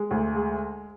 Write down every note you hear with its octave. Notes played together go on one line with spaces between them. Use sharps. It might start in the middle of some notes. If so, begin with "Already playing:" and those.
Already playing: G#3
D2
G#3